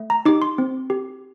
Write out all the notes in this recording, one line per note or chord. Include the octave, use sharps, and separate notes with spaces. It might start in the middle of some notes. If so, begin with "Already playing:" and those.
Already playing: A3
A#5
D#4 G4 D6
C6
C4
G4